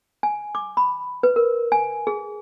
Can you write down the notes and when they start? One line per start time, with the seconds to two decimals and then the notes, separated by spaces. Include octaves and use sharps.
0.23 G#5
0.55 D6
0.77 B5
1.23 B4
1.36 A#4
1.72 G#5
2.07 G#4